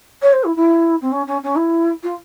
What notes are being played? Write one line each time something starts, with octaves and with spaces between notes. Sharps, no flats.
C#5
C5
E4
E4
C4
C#4
C#4
C#4
E4
F4